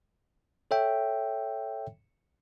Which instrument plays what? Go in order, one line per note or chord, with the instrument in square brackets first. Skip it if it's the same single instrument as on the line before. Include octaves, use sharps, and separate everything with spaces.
[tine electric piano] A4 C#5 E5 G5